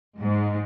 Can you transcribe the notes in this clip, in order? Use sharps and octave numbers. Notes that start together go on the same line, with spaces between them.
G#2